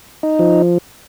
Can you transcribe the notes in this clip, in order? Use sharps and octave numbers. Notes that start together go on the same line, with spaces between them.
D#4
F3